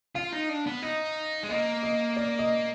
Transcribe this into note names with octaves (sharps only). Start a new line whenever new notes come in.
F4 F5
D#4
D4
B3
D#4 D#5
G#3
A#3 D#5
D#5
D5
D#5